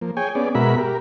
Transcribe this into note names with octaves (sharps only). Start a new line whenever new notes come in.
F3 A#3
G#4 C#5 G5 G#5
B3 C#4 G#4 D5
B2 G#3 F#4 A#4 E5 B5
G4 A#4